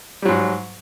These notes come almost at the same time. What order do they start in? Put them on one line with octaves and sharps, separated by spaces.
G3 F#3 G#2